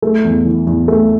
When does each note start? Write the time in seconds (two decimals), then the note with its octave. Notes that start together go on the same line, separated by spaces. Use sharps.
0.02 A3
0.25 E2
0.45 E3
0.67 E2
0.88 A3